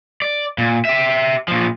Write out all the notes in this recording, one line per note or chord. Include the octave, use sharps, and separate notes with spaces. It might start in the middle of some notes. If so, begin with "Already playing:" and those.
D5
A#2
G4 E5
A#2 F3